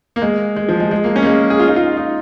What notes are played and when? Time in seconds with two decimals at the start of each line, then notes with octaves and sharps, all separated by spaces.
0.16 A#3
0.22 G#3
0.56 G#3
0.69 F3
0.80 G#3
0.91 G#3
1.04 A#3
1.16 C#4
1.22 A#3
1.26 G#3
1.50 G#4
1.60 F4
1.68 D#4
1.76 F4
1.97 D#4